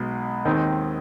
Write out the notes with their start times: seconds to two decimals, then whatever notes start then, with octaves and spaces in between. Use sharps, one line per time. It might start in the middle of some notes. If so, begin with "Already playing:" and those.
Already playing: B1 B2 G#3
0.45 D#2 D#3 G#3 C4 D#4